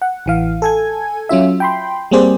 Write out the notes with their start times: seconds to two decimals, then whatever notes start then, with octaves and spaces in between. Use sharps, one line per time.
0.02 F#5
0.26 A1 E3 F5
0.62 A4 G#5 G#6
1.29 F#3 C#4 F4 E5
1.60 G5 B5 C6
2.11 G3 A#3 C4 G#4 C5 D5